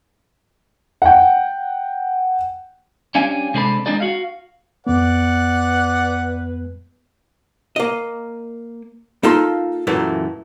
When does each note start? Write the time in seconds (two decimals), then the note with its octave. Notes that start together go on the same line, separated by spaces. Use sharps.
1.02 F#5 G5
3.15 G3 C#4 D4 F5 G#5
3.54 C3 G#3 C4 D4 A4 B5
3.86 G#3 C4 D4 D#4 G#4 D5
4.00 F#4 F5
4.87 F2 B3 B4 D5 F#5
7.76 A#3 D#5
9.23 A#3 D#4 F4 A4 C6
9.87 F#2 A#2 E3 A3